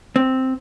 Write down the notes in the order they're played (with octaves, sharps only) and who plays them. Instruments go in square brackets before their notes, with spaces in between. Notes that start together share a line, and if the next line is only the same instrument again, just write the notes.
[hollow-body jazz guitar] C4